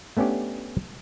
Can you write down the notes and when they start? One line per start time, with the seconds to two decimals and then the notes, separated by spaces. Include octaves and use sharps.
0.17 A3 B3 C#4 D4 G4